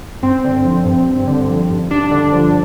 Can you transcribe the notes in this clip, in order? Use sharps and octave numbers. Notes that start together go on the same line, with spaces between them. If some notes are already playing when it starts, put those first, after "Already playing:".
G2 C4
D3
F3
G2
G2
D3
F3
G2
G2 D4
D3
F3